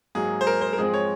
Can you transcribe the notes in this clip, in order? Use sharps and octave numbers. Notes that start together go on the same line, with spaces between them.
G#2 F#3 A#3 G#4
C5
A#4
C5
A#4
G#2 F3 G#3 C4 G#4
C#5